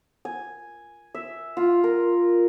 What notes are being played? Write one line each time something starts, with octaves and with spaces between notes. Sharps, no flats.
G#5
E5
F4
A#4